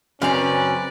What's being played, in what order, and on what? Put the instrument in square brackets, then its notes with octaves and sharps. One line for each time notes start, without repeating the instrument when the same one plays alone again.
[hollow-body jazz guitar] F#2 C#3 [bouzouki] C4 G#5 A#5 [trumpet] C#4 [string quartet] B4 D5